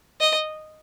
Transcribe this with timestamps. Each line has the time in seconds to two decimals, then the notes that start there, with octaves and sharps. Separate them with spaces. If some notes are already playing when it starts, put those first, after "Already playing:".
0.20 D#5